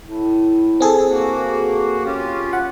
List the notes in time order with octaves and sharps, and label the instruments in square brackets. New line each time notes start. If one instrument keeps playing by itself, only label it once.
[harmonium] A2
[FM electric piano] C4 G#4 A4
[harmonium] A#3 F#4
C#4 F4 G4
[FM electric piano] F#5